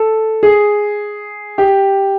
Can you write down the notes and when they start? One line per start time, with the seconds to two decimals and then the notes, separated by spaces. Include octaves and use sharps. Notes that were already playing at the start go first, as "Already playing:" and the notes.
Already playing: A4
0.43 G#4
1.58 G4